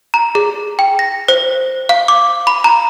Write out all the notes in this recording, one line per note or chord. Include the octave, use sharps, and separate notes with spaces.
A#5
G#4
G5
A#6
C5
F5
D6
B5
A#5